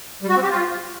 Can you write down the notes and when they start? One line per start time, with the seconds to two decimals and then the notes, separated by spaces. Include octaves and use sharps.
0.23 G3
0.29 F#4
0.36 C4
0.43 G4
0.50 F4